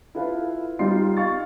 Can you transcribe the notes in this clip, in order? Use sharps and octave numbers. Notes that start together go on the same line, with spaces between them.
E4 F4 A4 B4 F5
G3 D#4 F4 C6 C7
F5 C#6 A6